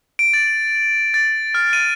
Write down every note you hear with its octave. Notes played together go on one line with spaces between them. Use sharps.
D7
A6
A6
F6
D#7